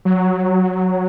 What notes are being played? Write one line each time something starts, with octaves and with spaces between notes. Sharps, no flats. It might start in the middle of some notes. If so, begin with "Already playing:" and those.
F#3